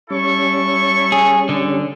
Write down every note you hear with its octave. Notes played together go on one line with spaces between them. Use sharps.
G3 C#4 E4 A4 C#6
G#4
D3